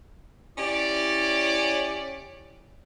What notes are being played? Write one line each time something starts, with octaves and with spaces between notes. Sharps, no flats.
C#4 E4 G4 C#5 D5